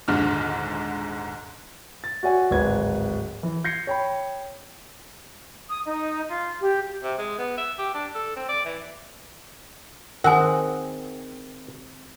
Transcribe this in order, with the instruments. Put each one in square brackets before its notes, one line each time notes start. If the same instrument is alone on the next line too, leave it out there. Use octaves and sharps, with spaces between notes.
[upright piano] D#1 G#1 G#2 D3 F6
[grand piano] A6
F#4 C#5 D5 E5 F#5 G#5
D1 G#1 B4 G#6
E3
G6 G#6 A#6 C7 C#7
C#5 G5 B5
[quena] D#6
D#4
F4
G4
[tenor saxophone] C3
G#3
B3
E5
G4
D4
A4
C4
D5
E3
[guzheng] D#3 C4 G#4 [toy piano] A#4 G#5 [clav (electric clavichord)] F#5